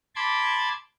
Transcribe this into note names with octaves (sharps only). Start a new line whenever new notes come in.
A5 B5 C6 D6 G#6